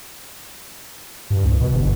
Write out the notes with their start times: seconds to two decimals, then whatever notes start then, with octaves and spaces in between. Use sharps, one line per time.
1.30 G2
1.44 C2
1.61 B2
1.74 G1